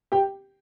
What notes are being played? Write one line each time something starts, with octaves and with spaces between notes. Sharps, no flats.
G4 G5